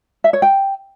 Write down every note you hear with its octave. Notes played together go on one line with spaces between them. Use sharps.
E5
C#5
G5